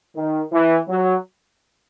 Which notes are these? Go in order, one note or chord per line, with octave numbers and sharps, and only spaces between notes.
D#3
E3
F#3